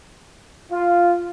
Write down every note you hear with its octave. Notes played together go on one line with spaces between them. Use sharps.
F4